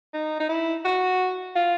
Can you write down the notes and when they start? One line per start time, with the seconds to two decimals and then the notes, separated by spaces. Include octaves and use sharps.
0.13 D#4
0.40 D#4
0.49 E4
0.85 F#4
1.56 F4